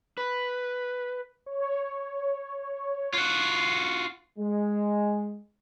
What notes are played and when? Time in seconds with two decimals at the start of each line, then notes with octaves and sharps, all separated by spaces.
0.18 B4
1.46 C#5
3.13 F4 F#4
4.38 G#3